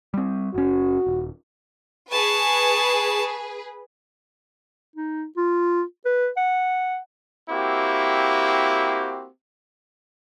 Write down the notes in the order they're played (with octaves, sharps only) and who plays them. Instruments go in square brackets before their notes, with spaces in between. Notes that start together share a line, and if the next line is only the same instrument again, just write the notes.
[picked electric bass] G3 C4
[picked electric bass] F#1 C#4 [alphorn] F#4
[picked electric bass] D#1
[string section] G#4 B4 [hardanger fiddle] A5 C#6
[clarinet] D#4
F4
B4
F#5
[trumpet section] A#3 C4 E4 F#4 G4